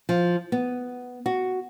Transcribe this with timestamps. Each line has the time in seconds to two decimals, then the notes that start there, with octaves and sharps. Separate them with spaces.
0.09 F3
0.52 B3
1.26 F#4